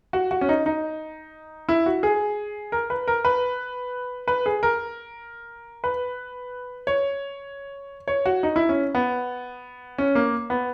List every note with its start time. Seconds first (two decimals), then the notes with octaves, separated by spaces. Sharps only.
0.13 F#4
0.31 F#4
0.41 C#4
0.49 D#4
0.66 D#4
1.69 E4
1.86 F#4
2.03 G#4
2.72 A#4
2.90 B4
3.08 A#4
3.25 B4
4.28 B4
4.46 G#4
4.63 A#4
5.84 B4
6.87 C#5
8.08 C#5
8.26 F#4
8.43 D#4
8.56 E4
8.69 C#4
8.95 B3
9.98 C#4
10.15 A#3
10.50 B3